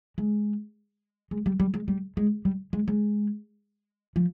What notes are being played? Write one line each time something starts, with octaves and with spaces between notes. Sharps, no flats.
G#3
G#3
G3
G3
G#3
G3
G#3
G3
G#3
G#3
F3